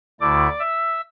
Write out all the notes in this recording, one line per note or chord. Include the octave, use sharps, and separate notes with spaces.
D2 D3 A3 E4 D5 D6
E5 E6